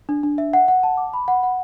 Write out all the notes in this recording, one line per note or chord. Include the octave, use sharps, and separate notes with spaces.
D4
D4
E5
F#5
F#5
A5
D6
B5
F#5
F#5